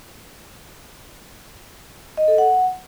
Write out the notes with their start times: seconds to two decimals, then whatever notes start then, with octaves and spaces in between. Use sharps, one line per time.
2.17 D#5
2.28 A4
2.38 F#5